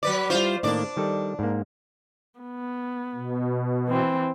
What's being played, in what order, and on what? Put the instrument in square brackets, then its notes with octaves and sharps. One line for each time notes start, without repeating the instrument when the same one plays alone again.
[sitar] F#3 B4 D5
[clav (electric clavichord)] G3 E4 [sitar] F4 C5
[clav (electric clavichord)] A2 D#3 A#3 [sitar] D4 D5
[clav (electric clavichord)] D#3 G3 A4
G#2 A#3
[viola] B3
[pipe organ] B2
[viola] E3 C4